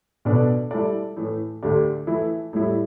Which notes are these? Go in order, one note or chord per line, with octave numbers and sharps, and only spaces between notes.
B2 B3 D4 A4 D5
G3 E4 A4 D5
A2 E3 A3
D2 D3 A3 G4 D5
E3 A3 E4
A2 G3 E4